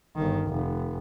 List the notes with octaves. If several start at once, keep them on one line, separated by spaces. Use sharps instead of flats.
G1 D#3
F1